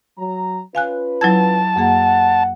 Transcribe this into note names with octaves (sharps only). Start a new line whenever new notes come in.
F#3 A#5
C#4 F4 B4 F5 G#5 F#6
F#3 E4 A5 G#6
F#2 A#3 G#4 F#5